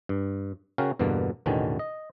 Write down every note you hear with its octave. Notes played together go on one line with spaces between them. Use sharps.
G2
C#3 C#4 F#4 A#4 F5 G5
E2 G2 B2 D3 A#3
A1 E2 B2 D3 D#3 C#4
D#5